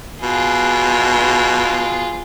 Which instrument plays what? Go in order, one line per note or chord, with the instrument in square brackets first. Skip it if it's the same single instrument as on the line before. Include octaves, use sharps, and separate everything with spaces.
[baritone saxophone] B2 [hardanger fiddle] F4 G#4